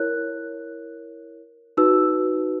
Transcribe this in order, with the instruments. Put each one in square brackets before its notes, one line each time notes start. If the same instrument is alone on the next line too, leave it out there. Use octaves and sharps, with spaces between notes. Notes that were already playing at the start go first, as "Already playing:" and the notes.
Already playing: [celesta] E4 A#4 C#5 F#6
D#4 F#4 B4 E6